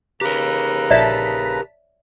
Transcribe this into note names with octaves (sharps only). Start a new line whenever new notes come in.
C#3 G4 A#4 B4 A#5
A#1 C#5 D5 E5 A5 B6